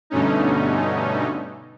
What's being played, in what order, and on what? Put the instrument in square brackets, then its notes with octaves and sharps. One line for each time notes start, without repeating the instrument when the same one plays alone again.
[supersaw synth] G2 B2 D3 A3 C#4 D#4